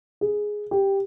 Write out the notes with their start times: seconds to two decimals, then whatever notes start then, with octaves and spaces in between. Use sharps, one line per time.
0.21 G#4
0.71 G4